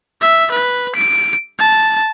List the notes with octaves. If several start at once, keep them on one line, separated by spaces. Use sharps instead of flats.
E5
B4
D7
A5